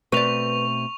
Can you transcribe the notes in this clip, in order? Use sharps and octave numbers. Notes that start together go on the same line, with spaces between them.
B2 A3 C4 B4 D5 C#6 F7